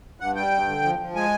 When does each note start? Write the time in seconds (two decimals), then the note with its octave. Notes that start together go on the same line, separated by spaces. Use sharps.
0.20 G2 F#5
0.36 G3 G5
0.51 G2
0.68 D3
0.84 F3
0.99 F3
1.15 G#3 G#5